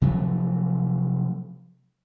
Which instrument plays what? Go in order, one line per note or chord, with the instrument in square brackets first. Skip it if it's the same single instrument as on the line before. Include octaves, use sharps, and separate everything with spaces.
[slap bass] C3 F3 F#3 A3